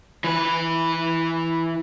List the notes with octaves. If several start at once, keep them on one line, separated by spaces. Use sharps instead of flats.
E3 B4